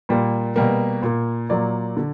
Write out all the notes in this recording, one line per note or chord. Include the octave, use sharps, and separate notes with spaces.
A#2 G3 A#3
B2 G3 A#3
A#2 A#3
A#2 F#3 A#3 D5
D3